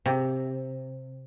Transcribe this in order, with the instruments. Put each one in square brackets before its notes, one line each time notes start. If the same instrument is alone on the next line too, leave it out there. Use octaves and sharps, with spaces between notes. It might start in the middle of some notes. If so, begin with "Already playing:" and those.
[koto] C3